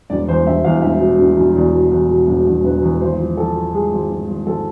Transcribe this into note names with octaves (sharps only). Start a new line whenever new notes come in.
E1 D5
E2 C5
E1 E5
E2 F5
E1 E5
B2
E1
E1
E2 D5
B2
E2
B2
E1
E1
E1 B4
E2
G#1 C5
F3
F3 A4
F3
G#3 G#4
G#1
G#1
G#1
G#1 A4